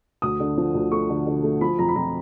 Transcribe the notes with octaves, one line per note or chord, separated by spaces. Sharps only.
D2 D#6
D3
F3
D2
A3 C#6
D3
D3
A3
F3 B5
F2 A#5
B5
F2 A#5